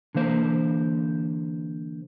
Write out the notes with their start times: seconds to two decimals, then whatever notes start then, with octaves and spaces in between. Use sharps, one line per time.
0.15 D3 E3 A#3 C5